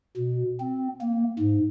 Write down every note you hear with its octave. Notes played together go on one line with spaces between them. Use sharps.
B2
C4
A#3
G#2